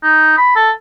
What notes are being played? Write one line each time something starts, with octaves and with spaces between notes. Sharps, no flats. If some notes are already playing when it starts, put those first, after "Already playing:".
D#4
B5
A4